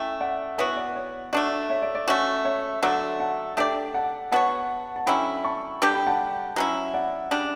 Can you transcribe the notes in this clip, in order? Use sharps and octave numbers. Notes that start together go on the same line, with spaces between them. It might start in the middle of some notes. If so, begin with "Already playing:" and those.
Already playing: A3 C#4 E4 E5 G5
D5 F#5
E3 B3 F#4 C#5 E5
D5
C#5
A3 D4 F#4 D5
C#5 E5
D5
D5
A3 C#4 F#4 C#5
C#5 E5
D3 F#3 A3 D5 F#5
F#5 A5
A3 D4 G4 D5 E5 G5
F#5 A5
B3 F#4 C#5 F#5 A5
A5
D3 F#3 C#4 E4 G5 B5
A5 C#6
D3 G3 D4 G4
G5 B5
F#5 A5
F#3 C#4 E4
D5 F#5
C#3 G3 D4